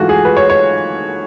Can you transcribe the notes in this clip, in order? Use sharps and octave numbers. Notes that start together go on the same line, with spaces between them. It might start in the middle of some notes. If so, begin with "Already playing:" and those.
Already playing: G#2 E3 A3 F4 F#4
G#4
B4
C#5
C#5